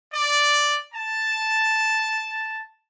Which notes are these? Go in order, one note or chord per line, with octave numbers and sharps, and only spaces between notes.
D5
A5